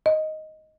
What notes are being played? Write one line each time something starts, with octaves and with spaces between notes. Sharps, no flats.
D#5